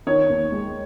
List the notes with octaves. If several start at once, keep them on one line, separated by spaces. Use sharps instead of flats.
D#3 C#5
D#2
G#3